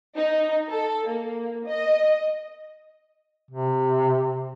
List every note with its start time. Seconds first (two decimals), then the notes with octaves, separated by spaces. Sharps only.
0.15 D#4
0.68 A4
1.07 A#3
1.66 D#5
3.51 C3